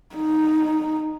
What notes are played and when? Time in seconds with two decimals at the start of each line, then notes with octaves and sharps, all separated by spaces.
0.15 D#4